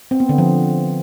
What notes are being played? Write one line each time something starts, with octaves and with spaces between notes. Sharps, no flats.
C4
B3
D3
F3